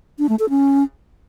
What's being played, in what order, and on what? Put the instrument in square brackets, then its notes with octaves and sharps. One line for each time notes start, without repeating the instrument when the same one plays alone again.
[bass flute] D4
A3
A4
C#4